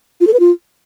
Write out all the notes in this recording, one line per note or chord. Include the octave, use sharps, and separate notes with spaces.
F4
A4
B4
F4